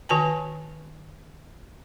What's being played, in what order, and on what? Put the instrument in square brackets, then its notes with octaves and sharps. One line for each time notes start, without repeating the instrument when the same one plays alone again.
[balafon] D#3 F#4 B4 G#5 A5